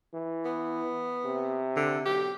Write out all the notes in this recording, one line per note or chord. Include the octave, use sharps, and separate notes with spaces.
E3
B3
C3
D3
B1 G4